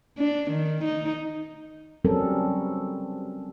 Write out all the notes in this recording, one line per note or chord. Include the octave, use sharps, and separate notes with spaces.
D4
D#3
D#4
F#3 G3 C4 C#4 A4 A#4